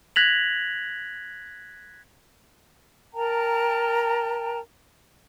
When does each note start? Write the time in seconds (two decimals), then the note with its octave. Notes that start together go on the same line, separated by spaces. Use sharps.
0.16 F#6 G#6 A#6 B6 F7 F#7
3.13 A#4 G5 A5 A#5